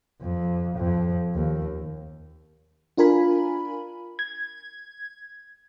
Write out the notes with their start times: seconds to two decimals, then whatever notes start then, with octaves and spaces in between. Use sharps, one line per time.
0.21 F2
0.77 F2
1.34 D#2
2.97 D4 F4 A#4 G#5 B5
4.19 G#6